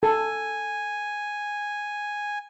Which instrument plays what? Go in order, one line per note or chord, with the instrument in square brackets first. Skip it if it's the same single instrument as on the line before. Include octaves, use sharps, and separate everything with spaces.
[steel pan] A4 [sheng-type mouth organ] G#5